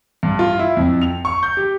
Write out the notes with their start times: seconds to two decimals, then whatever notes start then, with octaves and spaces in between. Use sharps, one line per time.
0.23 G2
0.39 F4
0.59 E4
0.77 F2
1.02 F7
1.25 C#6
1.43 G6
1.57 G4